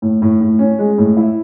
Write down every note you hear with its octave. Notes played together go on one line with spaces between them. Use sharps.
A2
A2
A2
C#4
G#3
A2
E4